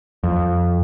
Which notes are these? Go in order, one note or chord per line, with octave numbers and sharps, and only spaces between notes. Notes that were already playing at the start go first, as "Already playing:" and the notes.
F2